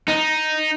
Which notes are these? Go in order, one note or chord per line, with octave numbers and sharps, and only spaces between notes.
D#4